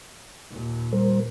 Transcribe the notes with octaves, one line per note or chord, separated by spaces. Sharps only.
D#2 A#2
G3 A#4 C5